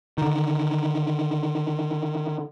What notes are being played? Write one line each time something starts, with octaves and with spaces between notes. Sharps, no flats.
D3 D#3